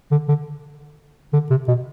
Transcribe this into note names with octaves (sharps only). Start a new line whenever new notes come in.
D3
D3
D3
C3
B2